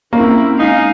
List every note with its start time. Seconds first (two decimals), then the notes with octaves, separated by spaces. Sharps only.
0.13 A#3 C4 C#4 E4
0.59 G#3 D#4 F5 G#5